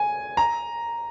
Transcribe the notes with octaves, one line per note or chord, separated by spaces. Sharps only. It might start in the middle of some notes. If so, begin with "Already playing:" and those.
Already playing: G#5
A#5